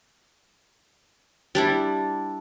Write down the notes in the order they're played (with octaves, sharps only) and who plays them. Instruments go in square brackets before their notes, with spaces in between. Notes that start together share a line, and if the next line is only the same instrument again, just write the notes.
[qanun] G3 D4 E4